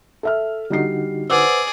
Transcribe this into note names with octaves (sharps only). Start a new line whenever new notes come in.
A4 E5 F6
D3 G3 D#4 F#4 C7
G#4 B4 C5 D5 F#5 D6 E6